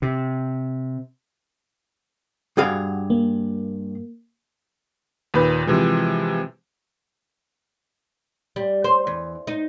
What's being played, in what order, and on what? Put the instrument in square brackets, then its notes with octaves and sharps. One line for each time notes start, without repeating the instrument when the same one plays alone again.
[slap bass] C3
[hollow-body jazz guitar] G2 G#4 F5 [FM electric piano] F#4
[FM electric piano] A#3
[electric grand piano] D#2 A#2 B4 G6
C3 E3 F3 G#3
[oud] G3
C5
E2
D#4